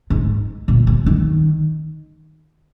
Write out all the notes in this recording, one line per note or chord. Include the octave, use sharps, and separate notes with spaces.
G#2
A#2
C3
D#3